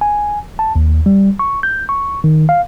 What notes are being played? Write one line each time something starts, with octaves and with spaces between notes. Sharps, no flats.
G#5
A5
D#2
G3
C#6
G6
C#6
D#3
F5